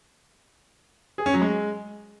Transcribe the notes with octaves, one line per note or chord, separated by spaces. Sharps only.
G#4
C#4
F#3
G#3